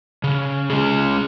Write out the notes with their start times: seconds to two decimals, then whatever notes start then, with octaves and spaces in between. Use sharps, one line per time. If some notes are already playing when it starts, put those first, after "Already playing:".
0.24 C#3
0.70 G#3 C#4 G#4